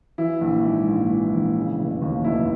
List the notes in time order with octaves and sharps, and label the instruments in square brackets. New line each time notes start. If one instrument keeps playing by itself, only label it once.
[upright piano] E3 E4
A#1
G#2
A#1
E3
A#1
C#3
F1
D#2
F1 E4